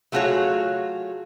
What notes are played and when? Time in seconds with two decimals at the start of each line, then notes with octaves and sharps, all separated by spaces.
0.12 F#3 A3 F4 F#4 G#4 C#5